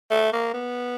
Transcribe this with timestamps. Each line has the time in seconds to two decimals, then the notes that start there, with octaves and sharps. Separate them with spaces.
0.10 A3
0.33 A#3
0.54 B3